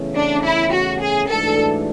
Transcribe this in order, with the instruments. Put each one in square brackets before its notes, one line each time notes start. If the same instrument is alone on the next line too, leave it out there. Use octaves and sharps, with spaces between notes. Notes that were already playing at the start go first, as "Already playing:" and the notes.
Already playing: [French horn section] E2 C#3 E3 A3 C#4
[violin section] D4
E4
F#4
G#4
[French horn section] G#2 E3 A3 D4 F#4 [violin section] A4